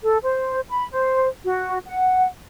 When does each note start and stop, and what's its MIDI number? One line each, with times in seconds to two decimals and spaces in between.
0.04 0.17 69
0.23 0.61 72
0.70 0.85 83
0.91 1.27 72
1.45 1.78 66
1.85 2.27 78